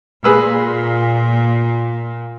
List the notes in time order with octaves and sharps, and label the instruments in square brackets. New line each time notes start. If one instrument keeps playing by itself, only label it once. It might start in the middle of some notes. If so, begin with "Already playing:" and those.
[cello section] A#2 [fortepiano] G#4 B4 E6